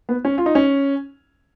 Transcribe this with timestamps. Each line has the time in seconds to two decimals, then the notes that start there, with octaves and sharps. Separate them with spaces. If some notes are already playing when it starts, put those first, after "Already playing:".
0.09 B3
0.25 C#4
0.38 F4
0.46 D#4
0.55 C#4